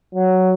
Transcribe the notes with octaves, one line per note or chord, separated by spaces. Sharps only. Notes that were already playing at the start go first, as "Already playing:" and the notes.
F#3